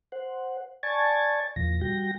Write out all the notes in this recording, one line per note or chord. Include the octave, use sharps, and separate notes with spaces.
C5 F#5
D5 G#5 A5 C#6 G#6 A6
E2 A#2 F3 A#6
G3 F#4 G5 A#6